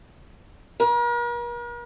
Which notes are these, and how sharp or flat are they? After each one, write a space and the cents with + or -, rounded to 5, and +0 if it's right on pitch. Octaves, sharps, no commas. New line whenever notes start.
A#4 +45